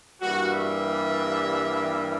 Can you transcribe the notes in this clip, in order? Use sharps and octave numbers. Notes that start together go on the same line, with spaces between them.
G2 E3 G3 A#3 F#4
E5